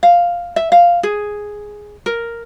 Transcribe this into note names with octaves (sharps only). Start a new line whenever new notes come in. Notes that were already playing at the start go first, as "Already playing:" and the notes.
F5
E5
F5
G#4
A#4